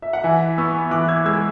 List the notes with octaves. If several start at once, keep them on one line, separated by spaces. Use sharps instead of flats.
E5
F#5
E3 E5 G#5
B3 C#6 E6
E3 D6 F#6
E6 G#6
G#3 E6 G#6